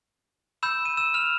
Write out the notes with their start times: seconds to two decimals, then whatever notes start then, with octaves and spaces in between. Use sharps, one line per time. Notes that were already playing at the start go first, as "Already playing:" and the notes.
0.63 B5 E6 G6 E7
0.85 D#7
0.97 E6 E7
1.14 F6 F7